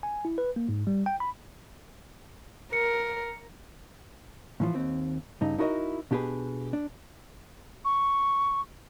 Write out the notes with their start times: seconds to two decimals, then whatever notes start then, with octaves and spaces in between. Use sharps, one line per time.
0.03 G#5
0.25 E4
0.38 B4
0.56 A#3
0.69 G#2
0.87 G3
1.06 G5
1.20 B5
2.73 A#4 C#7
4.60 A2 E3 F3
4.74 D#2 C4
5.41 G2 C#3 D#4
5.58 D#4 E4 F#4 A#4 C#5 D#5
6.11 B2 D4 G4 G#4 B4
6.73 D4
7.85 C#6